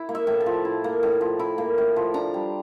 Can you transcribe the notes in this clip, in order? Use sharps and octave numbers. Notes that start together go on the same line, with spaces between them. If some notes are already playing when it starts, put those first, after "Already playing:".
Already playing: E4
A#3
E5
A2
A5
F3
E4
A#3
A2
F3
E4
A#3
A2
F3
D4 A#5
G3